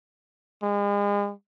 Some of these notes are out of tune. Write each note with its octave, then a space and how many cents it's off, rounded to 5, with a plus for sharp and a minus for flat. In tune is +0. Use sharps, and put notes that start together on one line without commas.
G#3 -40